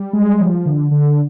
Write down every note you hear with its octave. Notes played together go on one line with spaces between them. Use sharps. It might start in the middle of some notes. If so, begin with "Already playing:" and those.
Already playing: G3
G#3
F3
D3
D3